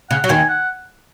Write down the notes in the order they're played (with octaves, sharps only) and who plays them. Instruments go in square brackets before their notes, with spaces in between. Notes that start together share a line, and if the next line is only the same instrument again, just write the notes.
[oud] C#3 [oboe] F#5
[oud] F#3
[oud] D#2 D#3 [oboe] G#5
[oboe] F#5